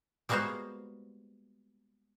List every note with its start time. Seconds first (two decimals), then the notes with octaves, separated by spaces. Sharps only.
0.29 G3 G#3 A#3 B3 F#4 C5